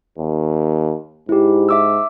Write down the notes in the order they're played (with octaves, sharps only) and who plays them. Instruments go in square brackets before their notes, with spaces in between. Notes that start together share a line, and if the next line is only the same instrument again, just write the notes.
[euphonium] D#2
[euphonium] G#2 [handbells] E4 G4
[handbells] E5 D6 E6